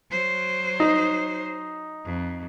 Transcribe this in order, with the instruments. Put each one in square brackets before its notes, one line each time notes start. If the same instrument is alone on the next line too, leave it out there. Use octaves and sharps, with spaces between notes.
[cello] F#3 C5
[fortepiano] D#4
[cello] F2